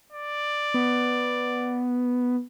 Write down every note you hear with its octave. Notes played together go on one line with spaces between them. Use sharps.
D5
B3